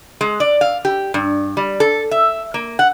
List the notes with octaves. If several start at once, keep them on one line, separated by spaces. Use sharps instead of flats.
G#3
D5
F5
G4
G2
G3
A4
E5
A#3
F#5